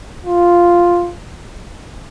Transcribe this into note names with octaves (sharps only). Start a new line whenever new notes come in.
F4